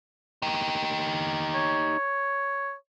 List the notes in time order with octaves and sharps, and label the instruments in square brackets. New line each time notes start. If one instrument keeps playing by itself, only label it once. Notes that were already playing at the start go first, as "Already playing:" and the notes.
[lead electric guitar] D#4 G4
[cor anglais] C#5